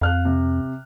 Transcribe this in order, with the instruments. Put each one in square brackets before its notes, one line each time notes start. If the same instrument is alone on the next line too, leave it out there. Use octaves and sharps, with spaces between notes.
[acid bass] F2 [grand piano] F5 F6 F#6
[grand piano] C3